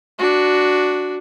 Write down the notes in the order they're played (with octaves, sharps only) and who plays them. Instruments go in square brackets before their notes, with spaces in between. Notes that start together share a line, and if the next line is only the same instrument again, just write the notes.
[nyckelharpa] D4 F#4